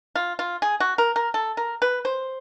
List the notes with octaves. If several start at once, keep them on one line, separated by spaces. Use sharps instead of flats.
F4
F4
G#4
F#4
A#4
A#4
A4
A#4
B4
C5